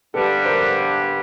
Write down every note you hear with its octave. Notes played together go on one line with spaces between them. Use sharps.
G2 D3 G3 A4 B4
A#4 C5